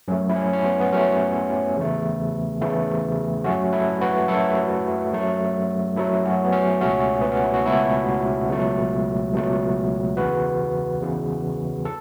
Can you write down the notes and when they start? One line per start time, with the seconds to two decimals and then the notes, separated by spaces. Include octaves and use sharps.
0.08 F#2 F#3 A3 C#4
0.29 E4
0.36 C#4
0.53 C#4
0.64 B3
0.80 B3
0.92 F#2 F#3 A3 C#4
1.77 E2 C#3 E3 A3
2.61 E2 C#3 E3 A3
3.44 F#2 F#3 A3 C#4 F#4
3.73 E4 A4
4.01 F#4 B4
4.28 F#2 F#3 A3 E4 A4
5.13 F#2 F#3 A3
5.96 F#2 F#3 A3 E4 A4
6.25 C#4 F#4
6.45 B3
6.52 C#4
6.80 C#2 B2 A3 C#4 F#4
7.21 B3
7.32 C#4
7.44 E4
7.54 F#4
7.65 C#2 B2 A3 E4 A4
8.49 C#2 B2 F#3 A3
9.33 C#2 B2 F#3 A3
10.17 E2 C#3 E3 F#4 B4
11.01 E2 C#3 E3
11.85 A4